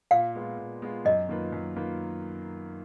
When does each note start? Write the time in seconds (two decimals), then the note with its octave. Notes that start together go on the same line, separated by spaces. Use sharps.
0.11 A#2 F5
0.35 G#3 B3 F4
0.58 A#2
0.82 G#3 B3 F4
1.05 F#2 D#5
1.29 D#3 A#3 F4 B4
1.52 F#2
1.76 D#3 A#3 F4 B4